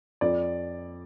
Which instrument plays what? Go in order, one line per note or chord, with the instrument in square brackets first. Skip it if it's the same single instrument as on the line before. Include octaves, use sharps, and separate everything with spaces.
[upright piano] F2 D5